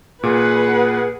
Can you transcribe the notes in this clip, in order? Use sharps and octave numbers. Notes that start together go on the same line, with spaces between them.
A#2 G#4 B4 F#5